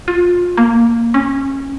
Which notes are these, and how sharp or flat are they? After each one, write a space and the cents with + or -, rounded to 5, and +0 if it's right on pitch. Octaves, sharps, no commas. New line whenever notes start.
F4 +25
A#3 -5
C#4 -20